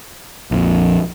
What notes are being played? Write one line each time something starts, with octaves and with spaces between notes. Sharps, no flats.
A#1 F2